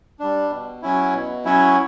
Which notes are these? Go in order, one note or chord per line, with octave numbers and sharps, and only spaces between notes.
G3 D4
B2
F#3 C#4 E4
B2
F#3 C#4 E4